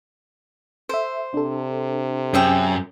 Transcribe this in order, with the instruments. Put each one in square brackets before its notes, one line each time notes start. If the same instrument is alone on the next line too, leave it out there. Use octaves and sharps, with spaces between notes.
[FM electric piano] A4 E5 [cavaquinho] C5
[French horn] C3 [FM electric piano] D4 A4
[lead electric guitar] F#2 [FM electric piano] C#4 [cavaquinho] G#4 E5 G5